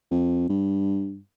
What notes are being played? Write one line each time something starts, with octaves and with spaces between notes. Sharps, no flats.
F2
G2